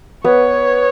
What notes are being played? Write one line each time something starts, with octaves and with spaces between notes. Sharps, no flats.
B3 C#5